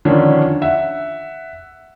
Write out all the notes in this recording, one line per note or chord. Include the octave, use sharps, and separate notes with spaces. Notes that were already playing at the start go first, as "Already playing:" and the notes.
D3 D#3 F3 C#4 D4
E5 F#5